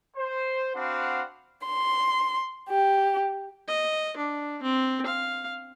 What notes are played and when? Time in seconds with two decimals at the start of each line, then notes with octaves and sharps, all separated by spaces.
0.16 C5
0.75 C4 D4 F#4 F5 F#5 B5
1.67 C6
2.70 G4
3.68 D#5
4.17 D4
4.63 C4
5.06 F5